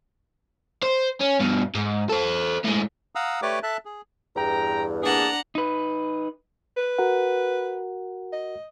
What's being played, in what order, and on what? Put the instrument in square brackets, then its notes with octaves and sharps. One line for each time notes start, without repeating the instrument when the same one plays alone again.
[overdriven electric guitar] C5
C#4
G2 B2
G#2
A4 C5
A2 G#3
[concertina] F5 F#5 A#5 D#6 E6
A3 G4 B4 C#5 D5 D6
A4 E5 A5 F#6
G#4
[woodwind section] E2 G2 [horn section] G5 A#5
[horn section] A#3 G#4 A5 [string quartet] D4 F#5 A#5
[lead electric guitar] D#4 B4
[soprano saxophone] B4
[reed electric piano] F#4 A#4 F#5
[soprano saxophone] D#5